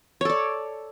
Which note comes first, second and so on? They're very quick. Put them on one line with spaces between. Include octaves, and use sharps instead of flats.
C#5 A4 D5